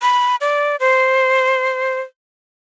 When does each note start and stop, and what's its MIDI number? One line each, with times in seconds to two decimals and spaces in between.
0.02 0.36 83
0.41 0.76 74
0.80 2.01 72